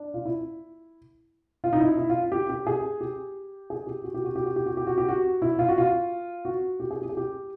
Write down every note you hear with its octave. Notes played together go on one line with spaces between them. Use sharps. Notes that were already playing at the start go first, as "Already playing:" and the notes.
Already playing: D4
F4
E4
F4
D#4
E4
E4
F4
G4
G4
G#4
G4
G#4
G4
F#4
G4
F#4
G4
F#4
G4
F#4
G4
F#4
G4
F#4
E4
F4
F#4
F4
F#4
G4
G#4
G4
G#4
G4